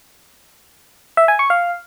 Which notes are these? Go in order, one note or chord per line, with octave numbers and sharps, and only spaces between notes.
E5
G#5
C#6
F5